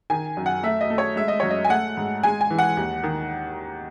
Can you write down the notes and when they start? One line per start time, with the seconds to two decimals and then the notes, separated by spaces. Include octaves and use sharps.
0.10 D#3 G#5
0.37 F#2
0.46 F#5
0.63 A3 E5
0.81 D#5
0.90 A3
0.98 C#5
1.16 G#3 E5
1.28 D#5
1.40 F#2 C#5
1.50 D#5
1.65 G#5
1.69 A3 F#5
1.97 G#2
2.23 G#3 G#5
2.41 G#5
2.50 E3
2.59 F#5
2.77 D#2
3.03 D#3